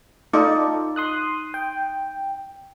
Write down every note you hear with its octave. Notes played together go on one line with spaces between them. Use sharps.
D#4 F4 A4 D5 D#5
C6 D#6 F#6
G5